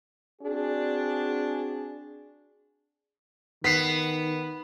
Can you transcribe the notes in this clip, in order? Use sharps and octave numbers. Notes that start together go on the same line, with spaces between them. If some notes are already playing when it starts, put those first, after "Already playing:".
C4 D4 F#4 G#4
D#3 B3 B6 C7